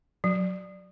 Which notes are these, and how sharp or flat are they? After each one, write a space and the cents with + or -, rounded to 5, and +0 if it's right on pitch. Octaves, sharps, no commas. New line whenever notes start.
F#3 -15